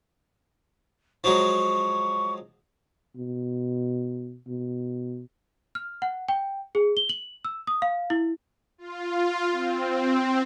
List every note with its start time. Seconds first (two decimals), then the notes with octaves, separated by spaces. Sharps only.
1.24 F3 F#3 G#3 C#6
3.16 B2
4.47 B2
5.75 F6
6.02 F#5
6.28 G5
6.75 G#4
6.97 G7
7.09 F#7
7.45 E6
7.67 D#6
7.82 F5
8.10 E4
8.78 F4
9.52 C4